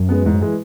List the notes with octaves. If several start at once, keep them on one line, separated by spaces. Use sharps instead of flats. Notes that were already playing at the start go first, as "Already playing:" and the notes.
Already playing: F#2
G#3 B3
E2 G#2
F#2
E3 G#3